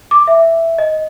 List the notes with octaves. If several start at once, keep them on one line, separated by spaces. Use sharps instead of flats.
D6
E5
D#5